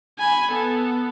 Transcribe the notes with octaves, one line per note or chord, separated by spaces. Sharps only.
G#5 B5
B3 A4